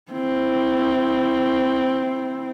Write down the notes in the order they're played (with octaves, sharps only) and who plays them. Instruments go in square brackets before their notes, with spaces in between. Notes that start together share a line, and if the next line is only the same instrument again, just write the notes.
[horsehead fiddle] C4 E4